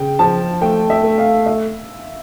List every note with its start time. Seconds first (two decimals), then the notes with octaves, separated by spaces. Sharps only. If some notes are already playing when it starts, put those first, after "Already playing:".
Already playing: C#3 G5
0.19 F3 A5
0.61 A3 G5
0.90 E5
1.03 A3
1.18 F5
1.46 E5